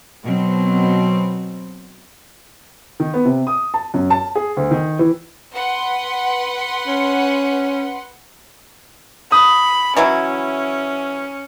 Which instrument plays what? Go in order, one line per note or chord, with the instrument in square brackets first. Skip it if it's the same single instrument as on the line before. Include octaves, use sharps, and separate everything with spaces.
[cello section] B2 F#3 C4
[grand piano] D#3
B3
C3
D#6
A5
F#2
A5
G#4
D2
D#3
E3
[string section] B4 F#5 C6
[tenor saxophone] C#4
[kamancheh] B5 [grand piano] D#6
[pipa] E3 F#3 E4 [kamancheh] C#4